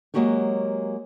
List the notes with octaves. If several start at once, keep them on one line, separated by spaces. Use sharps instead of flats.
F#3 G#3 A#3 F#4 G4 C#5